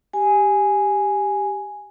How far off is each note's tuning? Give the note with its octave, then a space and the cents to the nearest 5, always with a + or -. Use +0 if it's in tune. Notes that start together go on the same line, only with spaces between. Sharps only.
G4 +0 G#5 +0